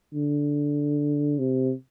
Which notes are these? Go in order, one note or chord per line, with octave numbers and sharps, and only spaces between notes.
D3
C3